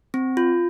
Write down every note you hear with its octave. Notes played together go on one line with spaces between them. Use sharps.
C4
F4